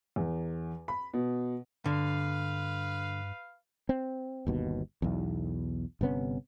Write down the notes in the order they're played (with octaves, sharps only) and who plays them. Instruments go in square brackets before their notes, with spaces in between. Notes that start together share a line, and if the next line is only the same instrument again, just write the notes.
[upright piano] E2
B5
B2
[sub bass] G2 [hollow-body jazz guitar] D3 [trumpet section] B4 F5
[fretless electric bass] C4
G1 D#2 B2
B1 E2
G1 C3 B3 C#4